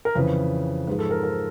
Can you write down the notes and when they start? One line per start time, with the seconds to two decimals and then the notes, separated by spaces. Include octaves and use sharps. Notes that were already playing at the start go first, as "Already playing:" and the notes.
0.05 A#4
0.15 F2 C#3 E3 B4
0.87 G#2 F3 G#3 B4
0.99 A4
1.11 A#4
1.23 A#4